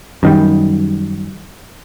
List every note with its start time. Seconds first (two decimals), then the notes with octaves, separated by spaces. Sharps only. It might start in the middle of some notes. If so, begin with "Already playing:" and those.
0.23 F#2 D#3 G3